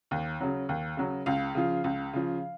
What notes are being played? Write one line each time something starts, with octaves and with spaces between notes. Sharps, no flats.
D#2
C#3 F#3
D#2
C#3 F#3
C#2 F5
C#3 F3
C#2
C#3 F3